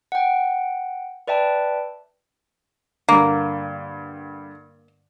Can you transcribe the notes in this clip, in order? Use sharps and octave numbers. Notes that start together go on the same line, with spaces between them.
F#5 G5
B4 D5 E5 G5 A5
G2 D3 A#3